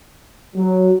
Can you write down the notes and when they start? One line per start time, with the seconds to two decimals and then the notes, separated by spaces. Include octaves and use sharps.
0.55 F#3